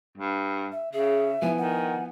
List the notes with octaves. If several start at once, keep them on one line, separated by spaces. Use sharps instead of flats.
G2
E5
C#3 G#4 E5
F3 B3 E4 G#5
D#3 F#5